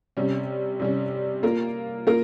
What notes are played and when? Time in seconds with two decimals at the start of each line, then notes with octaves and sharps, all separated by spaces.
0.17 C3 G3 C#4
0.80 C3 G3 C#4
1.43 A#3 F4 A#4
2.07 A#3 F4 A#4